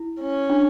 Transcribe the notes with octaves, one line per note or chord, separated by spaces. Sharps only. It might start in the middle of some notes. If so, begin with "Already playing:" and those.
Already playing: E4
C#4
D4